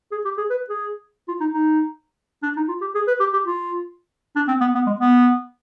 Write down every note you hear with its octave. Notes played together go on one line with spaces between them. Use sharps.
G#4
G4
G#4
B4
G#4
F4
D#4
D#4
D4
D#4
F4
G4
G#4
B4
G4
G4
F4
D4
C4
B3
B3
G#3
B3